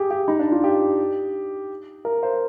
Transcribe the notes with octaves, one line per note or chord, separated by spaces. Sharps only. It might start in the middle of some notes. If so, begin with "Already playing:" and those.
Already playing: G4 G#4
G4
D#4
D4
F4
G4
A#4
C5